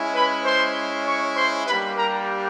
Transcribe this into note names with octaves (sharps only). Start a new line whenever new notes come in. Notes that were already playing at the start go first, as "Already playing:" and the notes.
Already playing: G#3 C#4 E4
B4 B5
C5 C6
C#5 C#6
C5 C6
G3 A#3 D4 G4 B4 B5
A#4 A#5